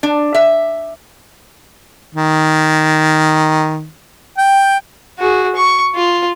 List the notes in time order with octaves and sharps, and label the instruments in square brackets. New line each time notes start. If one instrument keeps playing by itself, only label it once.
[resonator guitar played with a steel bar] D4
E5
[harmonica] D#3
G5
[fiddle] F#4 G#4
C#6
F4